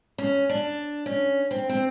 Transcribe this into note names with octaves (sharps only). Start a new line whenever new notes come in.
C#4
D4
C#4
C4
C4